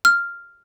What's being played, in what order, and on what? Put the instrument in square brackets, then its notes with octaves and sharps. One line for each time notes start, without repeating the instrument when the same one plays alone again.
[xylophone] F6